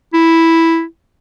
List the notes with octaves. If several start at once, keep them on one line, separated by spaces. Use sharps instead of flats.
E4